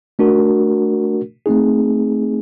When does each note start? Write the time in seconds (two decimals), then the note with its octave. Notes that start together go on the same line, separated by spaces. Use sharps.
0.19 A3 D4 F#4 A#4
1.46 A3 C4 D#4 G#4